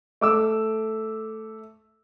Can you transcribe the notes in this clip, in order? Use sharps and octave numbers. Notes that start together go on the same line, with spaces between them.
A3 D6 E6